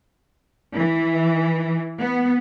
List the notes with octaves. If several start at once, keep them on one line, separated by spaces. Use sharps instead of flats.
E3
B3